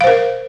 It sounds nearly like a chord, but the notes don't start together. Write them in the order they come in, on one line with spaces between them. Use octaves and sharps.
F5 C5 A#4